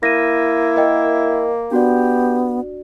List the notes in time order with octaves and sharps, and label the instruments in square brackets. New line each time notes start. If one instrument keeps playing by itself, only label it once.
[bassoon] A#3 [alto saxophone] E4 [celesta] A#6 D#7
[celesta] A#4 D#5 G5
[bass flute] B3 [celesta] D4 F#4 D5 [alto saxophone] G4